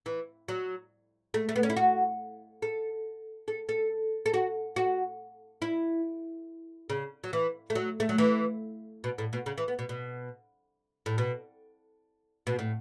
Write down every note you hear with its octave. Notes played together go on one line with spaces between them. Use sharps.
E3
F#3
A3
A3
B3
C#4
E4
F#4
A4
A4
A4
A4
F#4
F#4
E4
C#3
F#3
E3
A3
F#3
A3
F#3
E3
B2
A2
B2
C#3
E3
B3
B2
B2
A2
B2
B2
A2